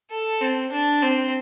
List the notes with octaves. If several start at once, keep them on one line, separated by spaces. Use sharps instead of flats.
A4
C4
D4
C4